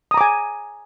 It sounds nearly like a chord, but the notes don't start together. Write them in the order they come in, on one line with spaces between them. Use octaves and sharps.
D#6 A#5 D6 G#5